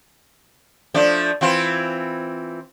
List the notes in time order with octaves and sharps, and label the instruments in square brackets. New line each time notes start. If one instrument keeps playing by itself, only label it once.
[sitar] F3 A3 D4
E3 C4 F4